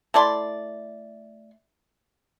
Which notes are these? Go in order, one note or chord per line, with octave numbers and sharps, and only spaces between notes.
A3 E4 D5 C6